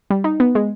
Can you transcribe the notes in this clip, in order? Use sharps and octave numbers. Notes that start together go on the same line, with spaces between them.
G3
D#4
B3
G#3